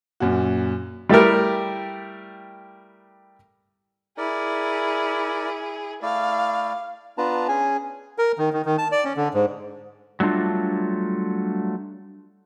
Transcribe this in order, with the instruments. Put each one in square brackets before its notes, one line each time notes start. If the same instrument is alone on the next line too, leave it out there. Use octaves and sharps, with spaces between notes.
[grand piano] F#2 A#2 F#4
[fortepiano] G3 A3 E4 G4 A#4
[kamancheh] E4 G#4 [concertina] A#4 D5
[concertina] A3 E4 D5 [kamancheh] F5
[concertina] B3 D4 F4 B4 A5 A#5
C#4 G#4 G#5
[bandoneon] A#4
D#3
D#3
D#3
A5
D5
C#4
D3
G#2
[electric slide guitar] F#3 G3 A3 D4 F4